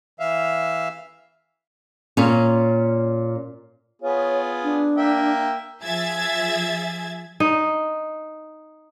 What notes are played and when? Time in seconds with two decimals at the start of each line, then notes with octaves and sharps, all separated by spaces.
0.20 E3 E5 F5
2.17 A#2 C#4
4.02 B3 F4 G#4 C#5
4.64 D4
4.97 A#3 E5 G5
5.83 F3 G#4 E5 G#6 A6
7.40 D#4